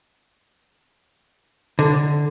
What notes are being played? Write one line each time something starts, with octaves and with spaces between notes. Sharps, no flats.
D3